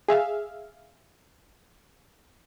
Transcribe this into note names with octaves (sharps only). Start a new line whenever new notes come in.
G#4 E5 F5